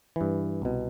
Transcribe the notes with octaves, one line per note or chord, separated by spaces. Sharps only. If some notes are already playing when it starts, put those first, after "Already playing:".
G2 E3
C2 B2